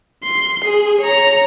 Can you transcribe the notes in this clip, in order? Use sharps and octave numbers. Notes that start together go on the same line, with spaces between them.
C6
G#4
C#5 A#5